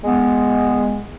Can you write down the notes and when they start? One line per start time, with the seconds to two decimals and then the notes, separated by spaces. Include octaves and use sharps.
0.04 G#3 B3